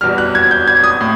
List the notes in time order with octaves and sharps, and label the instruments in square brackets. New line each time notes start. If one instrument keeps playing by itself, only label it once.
[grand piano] E2 B2 G3 F6
F#6
G#6
G6
G#6
D#6
A2